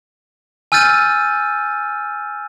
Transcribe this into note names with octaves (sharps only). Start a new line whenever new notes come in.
G#5 E6 F6 G6 A6 D#7